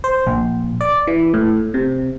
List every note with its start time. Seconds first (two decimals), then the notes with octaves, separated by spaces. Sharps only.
0.04 C5
0.27 A#1
0.81 D5
1.07 E3
1.34 A2
1.74 C3